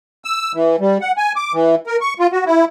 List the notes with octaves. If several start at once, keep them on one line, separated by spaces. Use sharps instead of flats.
E6
E3
G3
F#5
G#5
D6
E3
A#4
C#6
F4
F#4
E4